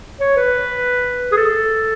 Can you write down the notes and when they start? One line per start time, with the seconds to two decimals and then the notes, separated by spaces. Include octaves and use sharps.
0.20 C#5
0.37 B4
1.32 G#4
1.37 A4